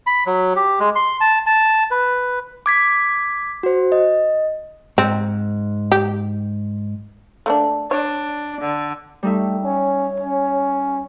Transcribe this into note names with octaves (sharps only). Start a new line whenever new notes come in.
B5
F#3
G4
G#3
C6
A5
A5
B4
D6 G#6 B6
F#4 C5
D#5
G#2 C4
G4
A3 A#3 D4
D4 C#5
D3
G3 A3 D#4 E5
C#4 C#5
C#4